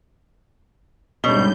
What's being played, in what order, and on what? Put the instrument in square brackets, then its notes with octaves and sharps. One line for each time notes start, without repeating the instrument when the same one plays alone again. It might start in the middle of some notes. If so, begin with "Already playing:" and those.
[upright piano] D2 C#4 G7 [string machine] G#2 G3 G6 [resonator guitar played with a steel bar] B2